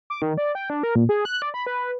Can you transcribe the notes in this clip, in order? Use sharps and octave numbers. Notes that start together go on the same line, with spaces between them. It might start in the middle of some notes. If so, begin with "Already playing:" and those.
D6
D#3
D5
G5
D4
A#4
A#2
G#4
F#6
D5
B5
B4